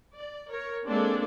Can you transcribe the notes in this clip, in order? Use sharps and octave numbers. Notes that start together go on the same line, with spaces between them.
D5
A#4 C#5
G#3 A#3 C4 D4 A4 D5